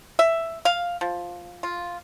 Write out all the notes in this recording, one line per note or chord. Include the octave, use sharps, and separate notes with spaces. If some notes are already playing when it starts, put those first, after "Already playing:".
E5
F5
F3
F4